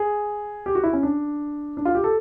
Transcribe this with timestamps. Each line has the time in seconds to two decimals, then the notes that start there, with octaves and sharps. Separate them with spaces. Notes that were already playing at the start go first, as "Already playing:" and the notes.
Already playing: G#4
0.66 G4
0.75 F#4
0.84 E4
0.93 C#4
1.03 D4
1.77 D4
1.85 F4
1.95 G4
2.04 A4